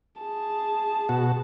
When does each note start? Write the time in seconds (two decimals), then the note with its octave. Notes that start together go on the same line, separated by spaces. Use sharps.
0.22 G#4 A5
1.09 B2 F#4